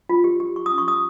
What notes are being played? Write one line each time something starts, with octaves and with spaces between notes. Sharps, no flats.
F4
G4
G4
G4 C#6
C#4 D#6
C#6
G4 D#6